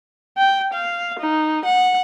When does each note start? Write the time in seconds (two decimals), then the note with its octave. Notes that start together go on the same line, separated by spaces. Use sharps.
0.37 G5
0.73 F5
1.19 D#4
1.65 F#5